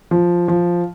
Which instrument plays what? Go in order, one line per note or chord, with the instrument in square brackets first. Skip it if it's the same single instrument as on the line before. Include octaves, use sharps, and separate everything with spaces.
[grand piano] F3
F3